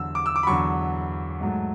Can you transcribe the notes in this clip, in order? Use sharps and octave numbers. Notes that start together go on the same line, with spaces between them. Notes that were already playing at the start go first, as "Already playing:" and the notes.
Already playing: E2 D3 F#3 E6
D6
E6
D6
B5
E2 D3 F#3 C#6
G#2 F#3 A3